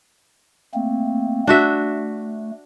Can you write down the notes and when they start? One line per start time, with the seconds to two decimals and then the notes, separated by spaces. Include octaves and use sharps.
0.74 A3 A#3 C4
1.47 A3 D4 F#4 E5